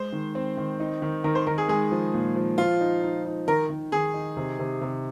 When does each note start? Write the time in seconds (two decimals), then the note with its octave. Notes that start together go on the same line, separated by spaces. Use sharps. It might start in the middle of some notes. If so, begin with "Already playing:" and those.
Already playing: G#3 C5
0.12 D#3
0.35 C4
0.57 D#3
0.80 D#4
1.02 D#3
1.24 D#3 A#4
1.35 C5
1.47 D#3 A#4
1.58 G#4
1.68 G#3 G#4
1.91 F3
2.14 A#2
2.36 F3
2.58 F3 F4
2.81 D#4
3.03 D#4
3.25 D#4
3.47 D#3 A#4
3.70 D#3
3.92 D#3 G#4
4.14 D#4
4.37 C3
4.59 C3
4.81 C3